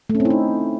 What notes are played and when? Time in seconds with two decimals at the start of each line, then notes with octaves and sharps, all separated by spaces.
0.10 A3
0.15 C#4
0.20 C4
0.25 E4
0.30 D#4